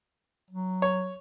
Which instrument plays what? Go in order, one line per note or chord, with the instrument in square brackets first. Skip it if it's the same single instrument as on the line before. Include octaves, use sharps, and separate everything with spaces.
[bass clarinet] F#3
[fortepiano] C#5